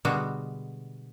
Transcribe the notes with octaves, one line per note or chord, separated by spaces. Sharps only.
B2 D3 G3 G#3 B3 F#4